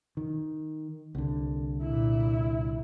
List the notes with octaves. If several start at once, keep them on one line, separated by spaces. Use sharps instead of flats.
D#3
C2 D3
A#2 E4